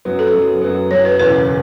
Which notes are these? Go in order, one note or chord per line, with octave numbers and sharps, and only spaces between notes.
F#2 F#3 B3
A4
F#2 F#3 B3
F#2 F#3 B3
F#2 F#3 B3 C#5
B4
E1 E2 C#3 B4